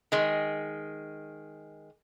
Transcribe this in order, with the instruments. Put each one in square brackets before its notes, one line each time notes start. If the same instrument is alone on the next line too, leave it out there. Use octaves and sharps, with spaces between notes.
[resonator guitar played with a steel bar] D#3 G#3